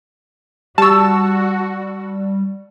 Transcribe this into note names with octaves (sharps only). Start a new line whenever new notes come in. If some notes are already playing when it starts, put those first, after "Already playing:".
G3 F#4 G4 A5 C#6 E6